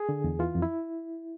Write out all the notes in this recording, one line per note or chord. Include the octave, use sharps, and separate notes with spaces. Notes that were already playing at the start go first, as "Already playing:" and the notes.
Already playing: G#4
D3
E2
E3 F4
F2
E4